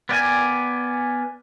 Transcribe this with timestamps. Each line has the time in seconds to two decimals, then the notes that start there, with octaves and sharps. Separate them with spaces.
0.09 B3 A#4 D5 G5 G#5